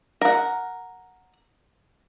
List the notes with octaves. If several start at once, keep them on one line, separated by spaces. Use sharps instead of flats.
A#4 F#5